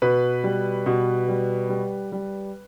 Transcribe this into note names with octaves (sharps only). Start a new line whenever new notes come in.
B2 B4
G3
B2
G3
G3
G3